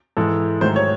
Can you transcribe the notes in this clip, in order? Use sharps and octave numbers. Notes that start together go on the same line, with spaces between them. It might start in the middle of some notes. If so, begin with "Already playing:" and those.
G#2 E3 G#3 A4
G#2 D#3 F#3 A3 C5
C#5